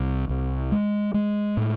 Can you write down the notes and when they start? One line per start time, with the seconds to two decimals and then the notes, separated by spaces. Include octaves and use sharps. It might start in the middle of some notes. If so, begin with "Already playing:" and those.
Already playing: C2
0.29 C2
0.72 G#3
1.14 G#3
1.57 A2